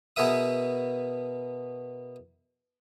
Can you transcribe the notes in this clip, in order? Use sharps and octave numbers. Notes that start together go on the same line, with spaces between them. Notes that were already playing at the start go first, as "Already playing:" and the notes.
B2 B3 G#4 A#4 E5 D#6